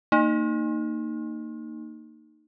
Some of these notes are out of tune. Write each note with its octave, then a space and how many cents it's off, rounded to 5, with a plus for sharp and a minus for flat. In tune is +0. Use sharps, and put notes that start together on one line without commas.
A#3 -20 D#4 -15